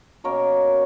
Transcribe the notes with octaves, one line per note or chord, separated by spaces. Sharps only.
B2 F#3 A#3 C#4 A#4 C#5